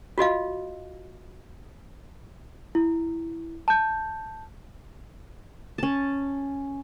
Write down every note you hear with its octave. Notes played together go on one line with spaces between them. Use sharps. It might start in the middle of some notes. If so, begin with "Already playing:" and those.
F4 F#4 D#5 F5
E4
A5 G6
C#4 A5